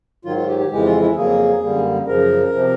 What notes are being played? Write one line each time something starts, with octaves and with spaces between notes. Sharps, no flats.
G#2 D#3 F#3 F4
F4
G4
G4
F2 C#3 E3 G#3 G4
F4
E4
F2 C#3 F#3 A#3 G#4
F#2 D3 G3 A#3
F#2 C#3 F3 A#4
C3 F3